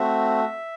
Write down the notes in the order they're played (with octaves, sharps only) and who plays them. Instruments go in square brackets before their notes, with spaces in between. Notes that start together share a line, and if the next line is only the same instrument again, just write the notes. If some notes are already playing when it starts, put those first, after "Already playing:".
Already playing: [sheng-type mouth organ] A3 C4 F#4 E5